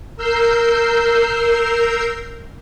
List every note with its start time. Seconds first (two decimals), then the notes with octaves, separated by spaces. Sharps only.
0.16 A#4 E6 G6 C7